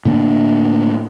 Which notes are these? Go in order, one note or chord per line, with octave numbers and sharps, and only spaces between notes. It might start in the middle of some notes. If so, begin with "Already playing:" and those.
A2 D3 A#3 D4